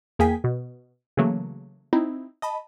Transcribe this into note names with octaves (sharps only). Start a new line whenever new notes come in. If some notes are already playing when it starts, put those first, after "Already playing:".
E2 A#3 G#4 G5 G#5 B6
B2
C#3 E3 F#3 A3 A#3
C4 D#4 E4
D#5 A5 B5